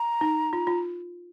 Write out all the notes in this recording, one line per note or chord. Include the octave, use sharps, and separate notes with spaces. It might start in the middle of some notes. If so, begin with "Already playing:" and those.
Already playing: A#5
D#4
F4
F4